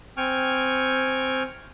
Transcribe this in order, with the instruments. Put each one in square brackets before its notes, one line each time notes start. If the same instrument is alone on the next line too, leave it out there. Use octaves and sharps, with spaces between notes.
[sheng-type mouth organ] C4 G5 G#5 C#6 F6